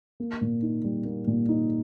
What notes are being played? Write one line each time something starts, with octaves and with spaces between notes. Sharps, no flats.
A#3
A#2
D#4
G3
A#3
A#2
D#4